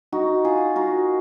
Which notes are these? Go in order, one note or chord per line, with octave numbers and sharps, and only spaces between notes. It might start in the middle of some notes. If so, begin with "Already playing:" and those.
D#4 F#4
F4 G#4
F#4 A#4